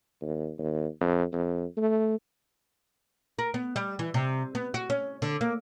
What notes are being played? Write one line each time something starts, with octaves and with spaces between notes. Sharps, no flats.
D#2
D#2
F2
F2
A3
A#4
B3
G3
E3
C3
B3
F#4
C#4
D3
A#3